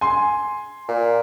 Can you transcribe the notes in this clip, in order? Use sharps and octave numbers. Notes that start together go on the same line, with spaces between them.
G#5 C6
A#2